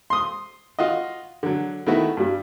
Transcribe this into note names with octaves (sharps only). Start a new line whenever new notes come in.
C6 D#6
F4 F#4 D#5
D3 F#3
D#3 A3 B3 E4 F#4 B4
G2 G3